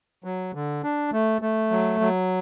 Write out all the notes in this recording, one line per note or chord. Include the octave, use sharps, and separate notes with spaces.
F#3
D3
D4
A3
A3
F#3
F#3